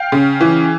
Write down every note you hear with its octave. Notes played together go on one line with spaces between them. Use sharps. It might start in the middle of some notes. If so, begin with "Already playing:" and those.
Already playing: F5 G5
C#3
E3